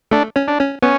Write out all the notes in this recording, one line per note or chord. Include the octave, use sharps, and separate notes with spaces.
A3 D4 A4
C#4 C#5
D4
C#4 C#5
B3 C#4 B4